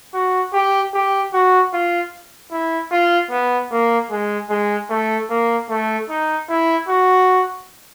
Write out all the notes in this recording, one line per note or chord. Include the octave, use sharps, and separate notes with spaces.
F#4
G4
G4
F#4
F4
E4
F4
B3
A#3
G#3
G#3
A3
A#3
A3
D#4
E4
F#4